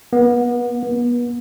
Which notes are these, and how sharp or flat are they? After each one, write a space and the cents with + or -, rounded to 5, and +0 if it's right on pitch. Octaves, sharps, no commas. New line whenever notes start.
B3 -30
B3 -35